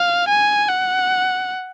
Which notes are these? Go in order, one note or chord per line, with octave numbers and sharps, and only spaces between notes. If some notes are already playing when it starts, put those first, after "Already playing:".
Already playing: F5
G#5
F#5